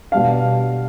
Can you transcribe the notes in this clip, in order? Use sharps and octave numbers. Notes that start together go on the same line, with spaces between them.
B2 G3 D4 F5